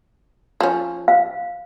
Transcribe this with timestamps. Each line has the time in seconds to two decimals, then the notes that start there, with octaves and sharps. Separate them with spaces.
0.60 F3 C#4
1.08 F5